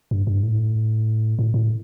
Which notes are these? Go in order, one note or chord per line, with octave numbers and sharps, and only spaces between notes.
G2
G2
A2
A2
A2